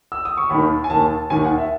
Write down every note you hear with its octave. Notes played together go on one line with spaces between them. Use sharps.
E6
D#6
C#6
D#2 D#3 B5
G#5
D#2 D#3 A5
D#2 D#3 G#5
F#5
E5